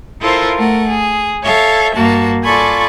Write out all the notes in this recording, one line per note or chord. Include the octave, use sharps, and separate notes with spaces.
E4 F4 A4 A#4 C5
A3 A#4 F#5
G#4
A4 C#5 E5 F5
G2 A#3 F#4 A5
F4 A4 D5 G#5 B5 C#6